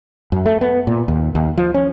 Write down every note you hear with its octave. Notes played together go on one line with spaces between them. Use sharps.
F#2
A3
B3
A#2
D#2
D#2
F3
C#4